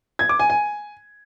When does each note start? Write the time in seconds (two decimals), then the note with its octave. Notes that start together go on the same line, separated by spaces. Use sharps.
0.19 G#6
0.29 D6
0.39 G#5
0.50 G#5